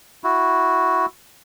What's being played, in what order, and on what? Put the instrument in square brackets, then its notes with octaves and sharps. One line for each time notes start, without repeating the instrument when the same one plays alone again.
[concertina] E4 F#4